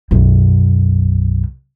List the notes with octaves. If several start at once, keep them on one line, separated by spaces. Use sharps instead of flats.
B1 F#2